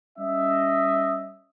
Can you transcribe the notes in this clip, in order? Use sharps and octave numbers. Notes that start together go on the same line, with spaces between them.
G3 C#4 D#5 E5